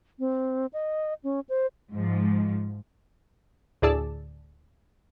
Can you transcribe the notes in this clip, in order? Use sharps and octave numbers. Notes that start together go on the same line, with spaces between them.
C4
D#5
C#4
C5
G#2 F3
D2 A2 G#4 D5 A5 E6